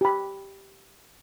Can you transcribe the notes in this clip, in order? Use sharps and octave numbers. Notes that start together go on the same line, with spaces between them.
G4 B5